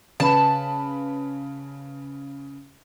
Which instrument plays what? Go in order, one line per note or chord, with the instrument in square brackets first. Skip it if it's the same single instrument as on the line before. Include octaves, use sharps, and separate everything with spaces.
[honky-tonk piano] C#3 B4 B5 [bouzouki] A5